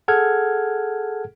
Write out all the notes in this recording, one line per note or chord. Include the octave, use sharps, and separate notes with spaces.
G#4 A4 F#5 F6 G#6